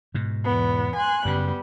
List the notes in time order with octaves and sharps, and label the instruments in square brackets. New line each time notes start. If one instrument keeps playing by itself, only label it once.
[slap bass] G#2 B2
[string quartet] E2 B3
G#5 C6 F#6
[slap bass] F#2 C#3 [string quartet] G3 B3